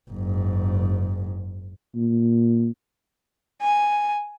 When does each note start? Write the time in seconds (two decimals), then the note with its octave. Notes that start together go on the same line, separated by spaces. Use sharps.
0.11 F#1 G#2
1.95 A#2
3.62 G#5